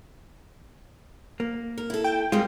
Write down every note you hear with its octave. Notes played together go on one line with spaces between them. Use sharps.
A#3
A#4
E4 A4
G5
G3 G#3 A#3 C4 F4